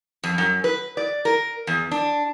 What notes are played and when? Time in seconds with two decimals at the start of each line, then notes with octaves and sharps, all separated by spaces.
0.24 F2
0.38 F#2
0.64 B4
0.97 D5
1.25 A#4
1.67 E2
1.91 D4